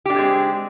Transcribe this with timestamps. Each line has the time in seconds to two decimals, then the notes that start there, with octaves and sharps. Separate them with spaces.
0.06 G4
0.10 D4
0.14 C4
0.18 G#3